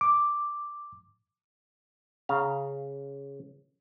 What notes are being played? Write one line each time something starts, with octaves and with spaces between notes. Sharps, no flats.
D6
C#3 F5 A#5